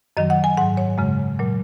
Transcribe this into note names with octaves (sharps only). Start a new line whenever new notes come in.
F#2 D#3 F#3 D#5
F#5
G#5
G#2 F#3 F#5
C#5
F#2 C#3 G#3
A#2 F#3